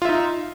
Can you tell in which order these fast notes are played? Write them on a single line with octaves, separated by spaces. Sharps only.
F4 E5 D#4